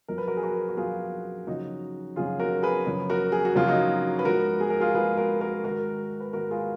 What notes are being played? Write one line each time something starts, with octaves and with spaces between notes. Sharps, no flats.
F#2 F3 A#4
B4
F#4 A#4
G#4
F#4 A#4
F#4
F#2 F3 F4 G#4
F#2 C#3 F3 D#4 F#4
F#2 C#3 F3 F4 G#4
F#4 A#4
G#4 B4
F#2 C#3 F3
F#4 A#4
G#4
F#4
F#2 C#3 F3 F4
D#4 F#4
B4
G#2 F3 F#4 A#4
G#4
A#4
F4 G#4
G#2 F3 G#4 B4
F#4 A#4
F#4 A#4
G#2 D#3 F#4 A#4
B4
G#2 D#3 F#4 A#4
F4 G#4